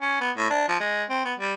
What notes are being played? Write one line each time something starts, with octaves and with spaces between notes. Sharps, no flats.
C#4
B3
A2
D4
F3
G#3
C4
B3
G3